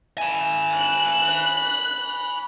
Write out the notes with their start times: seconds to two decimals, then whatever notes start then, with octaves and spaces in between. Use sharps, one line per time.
0.18 G#5 B5
0.75 F#6